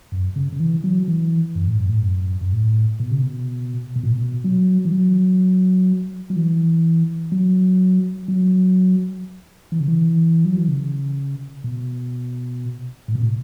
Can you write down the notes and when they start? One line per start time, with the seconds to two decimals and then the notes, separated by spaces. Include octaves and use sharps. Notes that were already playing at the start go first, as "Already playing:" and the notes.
0.12 F#2
0.36 C#3
0.52 C#3
0.60 E3
0.84 F#3
1.08 E3
1.55 F#2
1.67 A2
1.78 F#2
1.89 A2
2.00 F#2
2.41 F#2
2.52 A2
3.00 B2
3.11 C#3
3.22 B2
3.96 B2
4.03 A2
4.11 B2
4.44 F#3
4.85 E3
4.92 F#3
6.30 F#3
6.36 E3
7.32 F#3
8.28 F#3
9.72 E3
9.80 C#3
9.88 E3
10.45 F#3
10.57 E3
10.68 C#3
11.64 B2
13.08 A2
13.15 B2
13.22 A2